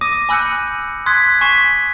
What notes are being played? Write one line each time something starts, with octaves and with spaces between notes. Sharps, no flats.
D6 D#6 A#6 D#7
G#5 B5 E6 F#6 G6 C#7
C6 D#6 F#6 G#6 B6
G#5 C6 C#6 B6 C7 E7